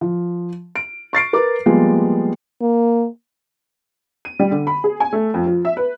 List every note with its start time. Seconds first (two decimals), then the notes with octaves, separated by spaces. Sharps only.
0.01 F3
0.76 D7
1.13 C#6 A6 C7 D7
1.33 A#4 B4 D6
1.66 F3 G3 G#3 A#3 B3 G#4
2.61 A#3
4.25 D#7
4.39 G3
4.51 D3
4.67 B5
4.84 G#4
5.00 G#5
5.13 A3
5.34 F2
5.46 F3
5.65 E5
5.77 B4